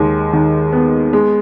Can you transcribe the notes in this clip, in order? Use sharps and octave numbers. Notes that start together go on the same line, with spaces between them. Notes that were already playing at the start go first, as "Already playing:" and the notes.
Already playing: D#2 G#3
D#3
B3
G#3